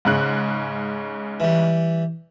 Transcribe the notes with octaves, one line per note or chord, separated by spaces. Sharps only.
G#2 C#3 F#6
E3 G3